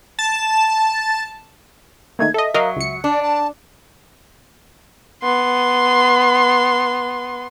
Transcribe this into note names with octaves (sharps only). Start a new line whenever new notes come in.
A5
D#3 A3 A#3 G#6
A4 D#5 E5
F#3 A#4 D#5 F5
C#2 C#7
D4 D5
A5
B3 C6